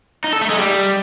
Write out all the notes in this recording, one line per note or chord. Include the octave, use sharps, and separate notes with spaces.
D#4
A4
A3
G#3
G3